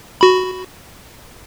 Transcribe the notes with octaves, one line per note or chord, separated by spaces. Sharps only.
F#4 B5